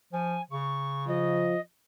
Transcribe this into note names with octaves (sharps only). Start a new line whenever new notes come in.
F3 G#5
C#3 C#6
F3 D#5